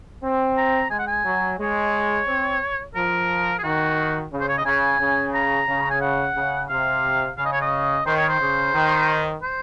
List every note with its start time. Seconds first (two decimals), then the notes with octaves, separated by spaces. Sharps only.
0.23 C4
0.57 A#5
0.90 G#3 G#5
0.98 F#5
1.07 G#5
1.25 F#3
1.59 G#3 C#5
2.27 C4
2.94 F3 A#4
3.58 G#4
3.63 D#3 F#4
4.31 C#3
4.40 C5
4.48 C#5
4.57 D#5
4.65 C#3 G#5
5.00 C#3
5.34 A#5
5.68 C#3
5.90 G#5
6.01 F#5
6.36 C#3
6.69 C3 F5
7.37 C#3 F5
7.45 D#5
7.52 C#5
7.61 D#5
8.06 D#3 C5
8.17 C#5
8.28 C5
8.40 C#3
8.74 D#3
9.42 C5